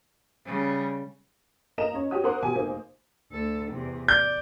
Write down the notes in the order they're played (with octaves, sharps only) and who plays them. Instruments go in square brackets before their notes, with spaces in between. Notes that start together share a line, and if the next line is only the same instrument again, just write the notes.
[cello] C#3 G3
[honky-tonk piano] A#3 D#5 A#5 E7
C#4 C#5
F#4 G4 C#5 D#6
A#4 C5 F#5 C6 D6
B2 G4 G#5
F1 A#3 C5
[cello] D2 A4
E2 C3
[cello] D5 [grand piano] G6